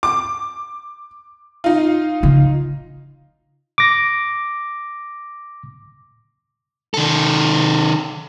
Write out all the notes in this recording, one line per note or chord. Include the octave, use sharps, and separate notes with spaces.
D6
D#4 F4
C#3
D6 A#6
D#3 A4